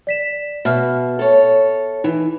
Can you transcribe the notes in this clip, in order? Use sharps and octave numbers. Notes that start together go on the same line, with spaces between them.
D5 B6 E7
B2 E5 F6
A4 C#5
E3 D#4